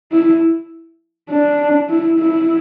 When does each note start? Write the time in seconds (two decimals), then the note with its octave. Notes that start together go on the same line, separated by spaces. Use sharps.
0.12 E4
1.30 D4
1.89 E4
2.19 E4